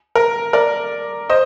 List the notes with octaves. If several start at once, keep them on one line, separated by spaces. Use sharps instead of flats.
A#4
A#4 D5
C5 D#5